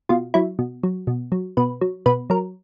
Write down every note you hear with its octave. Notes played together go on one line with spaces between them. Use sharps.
B2 F4
F#3 E4
B2
F#3
B2
F#3
B2 B4
F#3
B2 B4
F#3 A#4